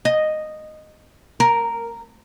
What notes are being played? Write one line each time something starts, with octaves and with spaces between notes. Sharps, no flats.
D#5
A#4